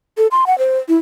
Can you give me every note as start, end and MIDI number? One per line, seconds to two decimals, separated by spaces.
0.17 0.27 69
0.31 0.45 84
0.47 0.58 78
0.59 0.78 72
0.88 0.95 64